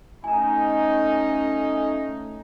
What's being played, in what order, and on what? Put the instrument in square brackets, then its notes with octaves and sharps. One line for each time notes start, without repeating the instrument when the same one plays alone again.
[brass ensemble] A3 C#4 D#4 [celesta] G#5 A#5